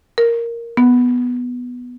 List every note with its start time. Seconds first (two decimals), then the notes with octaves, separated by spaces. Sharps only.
0.18 A#4
0.77 B3